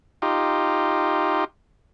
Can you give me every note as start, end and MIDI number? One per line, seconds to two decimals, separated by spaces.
0.22 1.45 63
0.22 1.45 65
0.22 1.45 67